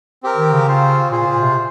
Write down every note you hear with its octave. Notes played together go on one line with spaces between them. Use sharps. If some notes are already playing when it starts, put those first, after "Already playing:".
C4 G4 A#4
D#3
C#3
C4 F4 C5
A#2 F4 G#4 C5
A#2
C3